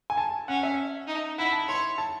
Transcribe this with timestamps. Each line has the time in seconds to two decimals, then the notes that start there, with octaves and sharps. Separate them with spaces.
0.10 G#5
0.17 A5
0.48 C#4 F#5
0.63 E5
1.07 D#4
1.38 E4 F#5
1.53 A5
1.68 C#5 C6
1.98 A5